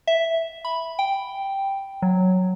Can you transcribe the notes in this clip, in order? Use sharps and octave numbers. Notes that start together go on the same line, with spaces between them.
E5
B5
G5
F#3